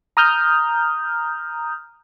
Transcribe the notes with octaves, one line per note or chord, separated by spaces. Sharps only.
A#5 D#6 F6 G6